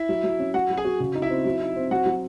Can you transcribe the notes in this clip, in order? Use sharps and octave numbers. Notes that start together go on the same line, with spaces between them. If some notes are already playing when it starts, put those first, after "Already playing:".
Already playing: E4 E5
F#3
F#3
C#4
F#3 F#4 F#5
F#3
G#4 G#5
F#4
C#3
D#4
E4 E5
C4
F#3
D#4
C4
F#3 F#4 F#5
F#3